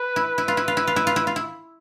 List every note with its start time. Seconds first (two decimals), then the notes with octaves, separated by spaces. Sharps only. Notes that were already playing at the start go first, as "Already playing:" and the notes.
Already playing: B4
0.16 E4
0.38 E4
0.48 F4
0.57 E4
0.68 F4
0.77 E4
0.87 F4
0.96 E4
1.07 F4
1.16 E4
1.27 F4
1.36 E4